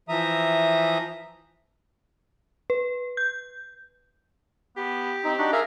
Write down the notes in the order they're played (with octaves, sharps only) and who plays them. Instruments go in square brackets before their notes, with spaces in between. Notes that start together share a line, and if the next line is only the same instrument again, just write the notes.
[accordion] E3 F3 E5 A#5 D#6
[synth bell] B4
G6
[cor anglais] B3 [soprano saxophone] G4
[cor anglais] C4 [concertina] D#4
[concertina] D4 D#4 [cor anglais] F#4
[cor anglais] G#4 [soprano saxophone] A#4 [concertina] E5 F5